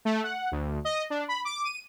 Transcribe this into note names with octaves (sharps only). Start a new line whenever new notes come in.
A3
F#5
D2
D#5
D4
B5
D6
D#7